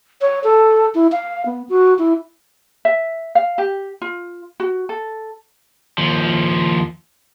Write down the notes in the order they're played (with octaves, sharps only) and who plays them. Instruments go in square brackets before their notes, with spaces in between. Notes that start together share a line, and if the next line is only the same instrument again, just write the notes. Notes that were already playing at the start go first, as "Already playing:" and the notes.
[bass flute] C#5
A4
E4
F5
B3
F#4
E4
[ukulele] E5
F5
G4
F4
F#4
A4
[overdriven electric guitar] D#2 F3